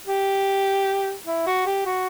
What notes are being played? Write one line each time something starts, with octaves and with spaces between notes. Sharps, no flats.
G4
E4
F#4
G4
F#4